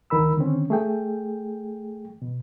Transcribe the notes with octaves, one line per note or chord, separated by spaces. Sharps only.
D2 D#3 A#4 B5 E6
D3 D#3 C4 C#4
A3 G#4 G5
B2